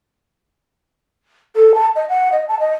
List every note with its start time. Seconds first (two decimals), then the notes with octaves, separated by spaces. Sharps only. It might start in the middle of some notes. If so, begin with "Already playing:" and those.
1.56 A4
1.75 A5
1.96 D#5
2.09 F#5
2.32 D#5
2.49 A5
2.60 D#5